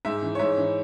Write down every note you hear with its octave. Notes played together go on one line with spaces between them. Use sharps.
G#2 E5
E3
C#5
G#2 E5
E3